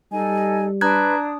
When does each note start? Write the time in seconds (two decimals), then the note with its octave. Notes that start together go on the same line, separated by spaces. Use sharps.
0.12 G3 D#4 A4 D#5 G#5
0.81 D4 B4 A#5 D#6 F#6 G#6